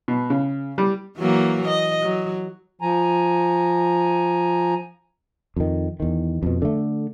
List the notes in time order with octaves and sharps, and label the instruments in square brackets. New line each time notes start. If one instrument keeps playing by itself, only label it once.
[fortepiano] B2
C#3
G3
[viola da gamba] E3 F#3 A#3
D#5
F#3
[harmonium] F3 G#5 A#5
[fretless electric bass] F2 D#3
E2 D#3
F2 B2
D3 A3